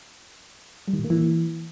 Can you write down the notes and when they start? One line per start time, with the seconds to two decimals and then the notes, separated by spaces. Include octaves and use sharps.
0.88 G3
0.93 D#3
0.99 A#2
1.04 A#3
1.10 E3